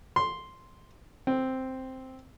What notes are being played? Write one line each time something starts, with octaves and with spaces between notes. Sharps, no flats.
C6
C4